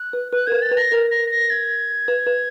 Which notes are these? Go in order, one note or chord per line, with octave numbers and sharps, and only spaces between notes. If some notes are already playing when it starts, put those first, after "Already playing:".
Already playing: F#6
B4
B4 F#6
A#4 B4 G#6
A6
B4
A#6
A#4
A#6
A#6
G#6
B4
B4